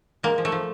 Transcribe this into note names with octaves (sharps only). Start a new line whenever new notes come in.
G#3 A#3
F3
A3
F3